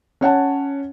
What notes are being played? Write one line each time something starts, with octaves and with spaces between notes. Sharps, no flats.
C#4 C#5 F#5 A5